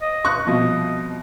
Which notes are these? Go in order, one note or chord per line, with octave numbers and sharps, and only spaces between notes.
D#5
C#6 F#6
C2 B2 F3 D#5